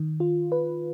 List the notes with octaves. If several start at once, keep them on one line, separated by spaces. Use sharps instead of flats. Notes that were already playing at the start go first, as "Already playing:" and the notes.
Already playing: D#3
F4
B4